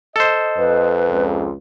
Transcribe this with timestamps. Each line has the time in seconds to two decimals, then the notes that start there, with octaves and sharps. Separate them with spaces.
0.16 A4 C5 D#5
0.58 F2 B4
1.10 C#2